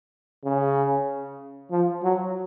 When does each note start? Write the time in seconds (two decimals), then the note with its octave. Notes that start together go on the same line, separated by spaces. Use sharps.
0.45 C#3
1.71 F3
2.03 F#3